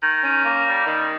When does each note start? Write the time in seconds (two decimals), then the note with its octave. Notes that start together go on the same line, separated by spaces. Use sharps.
0.01 D#3
0.22 C#4
0.44 A#3
0.65 G3
0.86 D#3